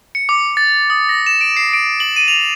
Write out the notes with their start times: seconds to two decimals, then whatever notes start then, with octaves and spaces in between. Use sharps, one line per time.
0.15 C#7
0.29 D6
0.57 A6
0.90 D#6
1.09 A#6
1.26 E7
1.41 D7
1.57 C7
1.73 D7
2.00 F#7
2.16 D#7
2.28 F7